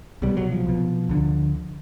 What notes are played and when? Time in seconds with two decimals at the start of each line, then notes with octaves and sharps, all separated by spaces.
0.22 C2 B2 G3
0.37 F#3
0.52 F3
0.66 C2 B2
1.09 D2 D3